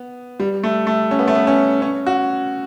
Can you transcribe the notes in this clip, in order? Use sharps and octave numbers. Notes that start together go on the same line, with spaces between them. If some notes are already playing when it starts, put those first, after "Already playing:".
Already playing: B3
G3
A3
A3
C#4
B3
A3
B3
C#4
C#4
F#4